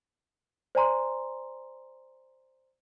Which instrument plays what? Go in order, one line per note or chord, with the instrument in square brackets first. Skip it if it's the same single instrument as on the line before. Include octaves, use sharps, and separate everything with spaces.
[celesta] C5 D5 G#5 A#5 C6